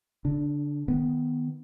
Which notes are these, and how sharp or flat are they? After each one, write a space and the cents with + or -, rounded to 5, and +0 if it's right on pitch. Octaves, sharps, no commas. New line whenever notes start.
D3 -35 D4 +0
D#3 +0 B3 +0